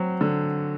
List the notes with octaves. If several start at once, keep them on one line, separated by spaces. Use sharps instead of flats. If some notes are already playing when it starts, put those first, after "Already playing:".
Already playing: F#3 C4
D3